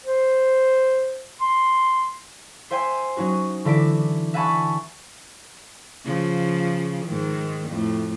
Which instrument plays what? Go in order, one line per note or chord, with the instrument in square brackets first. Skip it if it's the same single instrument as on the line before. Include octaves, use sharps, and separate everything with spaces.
[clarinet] C5
C6
[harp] C5 E5 G5 G#5 C6
F#3 C#4 D#4 F#4
D3 E3 E5 D6 B6 D7
E5 F#5 G#5 A5 B5 C#6
[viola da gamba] C#3 F3
G#2 D#3
F2 A2